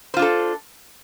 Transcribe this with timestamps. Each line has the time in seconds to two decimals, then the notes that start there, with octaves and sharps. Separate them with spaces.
0.14 C5
0.17 F4
0.19 D4
0.22 A4